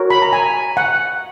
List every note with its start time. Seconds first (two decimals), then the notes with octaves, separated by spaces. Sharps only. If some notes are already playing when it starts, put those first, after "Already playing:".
Already playing: F#4 A#4 C#5
0.10 B5
0.22 A#5
0.33 G#5
0.77 F#5